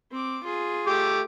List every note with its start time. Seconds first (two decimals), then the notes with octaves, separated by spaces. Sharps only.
0.11 C4 D6
0.44 F4 G#4
0.87 A3 G4 D6